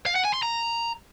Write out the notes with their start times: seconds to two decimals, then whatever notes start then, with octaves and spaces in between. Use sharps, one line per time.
0.06 F5
0.15 F#5
0.24 G#5
0.34 C6
0.43 A#5